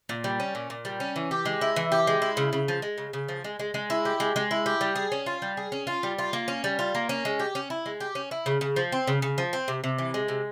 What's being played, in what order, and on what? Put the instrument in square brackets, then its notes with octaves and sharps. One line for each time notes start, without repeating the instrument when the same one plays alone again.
[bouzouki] A#2
G3
C#4
A#2
A#2
G3
C#4
E3
G4
G#3
E4
E3
G4
G#3
E4
C#3
C#3
F3
G#3
C#3
C#3
F3
G#3
G#3
G#3
E4
G4
G#3
G#3
E4
G4
G3
G#4
C#4
F4
G3
G#4
C#4
F4
G3
F4
A#3
C#4
G3
F4
A#3
C#4
G#3
G4
C#4
E4
G#3
G4
C#4
E4
C#3
C#3
F3
C4
C#3
C#3
F3
C4
C3
C3
E3
G#3
C3